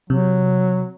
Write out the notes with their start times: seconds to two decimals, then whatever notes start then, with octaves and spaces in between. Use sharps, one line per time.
0.10 C3 F#3